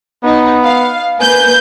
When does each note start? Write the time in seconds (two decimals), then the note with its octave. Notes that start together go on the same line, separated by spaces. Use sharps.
0.24 B3 D#4
0.63 F5
1.20 A#3 B4 G#5 G6